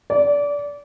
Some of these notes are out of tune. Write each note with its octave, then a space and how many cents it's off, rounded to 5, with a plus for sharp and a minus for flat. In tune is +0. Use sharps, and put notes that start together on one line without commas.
D5 -20